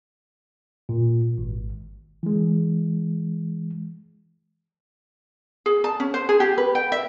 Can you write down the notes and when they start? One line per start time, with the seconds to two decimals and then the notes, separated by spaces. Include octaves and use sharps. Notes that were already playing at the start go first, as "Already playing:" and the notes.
0.89 A#2
1.38 G#1
2.23 E3 G#3
5.66 G#4
5.84 A5
6.00 C#4
6.14 C5
6.29 G#4
6.40 G4
6.58 B4
6.75 G5
6.92 E5